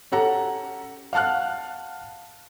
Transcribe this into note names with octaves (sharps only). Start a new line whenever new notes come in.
C#4 G4 A4 F#5 A#5
F5 F#5 A5 F6 F#6